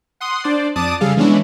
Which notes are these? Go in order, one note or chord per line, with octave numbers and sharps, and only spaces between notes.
F#5 C6 D#6
D4 C5 D5
F2 D5 A5 D6 D#6 D#7
C#3 G3 G#4 A4 F5
E3 G#3 B3 C#4 D4 E4